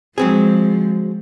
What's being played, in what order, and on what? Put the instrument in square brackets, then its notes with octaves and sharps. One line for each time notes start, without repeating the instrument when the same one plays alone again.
[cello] F3 G#3 [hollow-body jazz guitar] F#3 C4 G#4